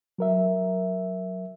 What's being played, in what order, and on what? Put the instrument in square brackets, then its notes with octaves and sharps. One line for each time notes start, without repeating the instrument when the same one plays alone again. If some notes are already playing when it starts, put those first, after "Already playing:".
[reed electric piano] F#3 A#4 E5